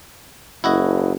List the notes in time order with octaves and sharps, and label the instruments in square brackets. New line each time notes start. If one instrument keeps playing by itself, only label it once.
[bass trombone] F#1 [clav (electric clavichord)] E4 F#4 D#5